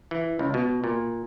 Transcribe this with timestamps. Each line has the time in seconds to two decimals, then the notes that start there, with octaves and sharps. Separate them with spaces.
0.11 E3
0.39 C#2
0.54 B2
0.84 A#2